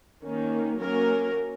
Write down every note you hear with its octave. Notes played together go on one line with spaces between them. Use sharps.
D#3 A#3 C#4
F#3 A#3 C#4 A#4